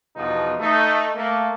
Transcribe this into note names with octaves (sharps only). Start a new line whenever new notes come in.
E2 B2 F3 G3 D#4
A3 D#4
A3 A#3